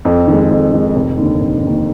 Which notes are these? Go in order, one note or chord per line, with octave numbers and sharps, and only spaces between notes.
F2
D#3
G#3
F2
D#3 G#3
F1
D#2 D3
F1
D#2 D3